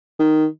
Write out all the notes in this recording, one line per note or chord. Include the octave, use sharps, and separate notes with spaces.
D#3